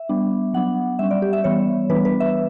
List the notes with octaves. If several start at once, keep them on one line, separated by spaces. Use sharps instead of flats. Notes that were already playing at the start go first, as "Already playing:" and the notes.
Already playing: E5
G3 B3 D4
F#3 B3 D4 F#5
G3 C#4 E5
D5
G4
E5
E3 G3 B3 C#5
E3 G3 B3 D4 B4
B4
E5